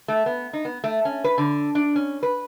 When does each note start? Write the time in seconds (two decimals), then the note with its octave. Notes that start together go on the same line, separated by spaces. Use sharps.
0.08 A3
0.26 B3
0.53 D#4
0.65 B3
0.84 A3
1.05 C#4
1.24 B4
1.38 D3
1.75 D4
1.96 C#4
2.23 B4